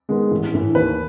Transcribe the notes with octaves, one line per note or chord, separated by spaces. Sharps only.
D#3 G#3 B3
A1
A2 E3
D#2 B4